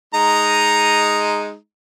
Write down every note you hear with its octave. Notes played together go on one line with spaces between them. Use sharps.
G#3 D#4 A#5